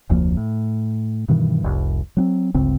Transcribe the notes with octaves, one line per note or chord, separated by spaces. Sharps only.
F1 D2 F3 A#3
A2
G2 B2 D#3 E3
F1 C2
F#3 B3 C4
G1 C#2 C#3 C4